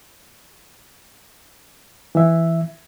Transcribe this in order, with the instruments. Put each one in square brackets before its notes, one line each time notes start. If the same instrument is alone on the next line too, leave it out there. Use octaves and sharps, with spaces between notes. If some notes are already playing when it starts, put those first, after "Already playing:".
[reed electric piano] E3 E5